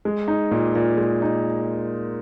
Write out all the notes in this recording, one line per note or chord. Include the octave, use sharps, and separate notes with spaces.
G#3
D#4
A#2
A#2
G#3
D#4